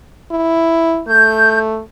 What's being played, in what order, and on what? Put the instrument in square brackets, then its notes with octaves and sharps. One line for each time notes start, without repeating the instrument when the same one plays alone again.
[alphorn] E4
[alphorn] A3 [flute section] G6